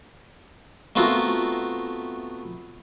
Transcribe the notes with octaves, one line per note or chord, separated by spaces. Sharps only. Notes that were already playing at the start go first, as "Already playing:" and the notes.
A3 B3 C4 F4 F#4 A#4